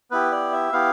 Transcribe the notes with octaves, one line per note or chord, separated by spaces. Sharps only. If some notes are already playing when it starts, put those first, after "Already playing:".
B3 E4 G4 B4
D5
E5
B3 E4 G4 F5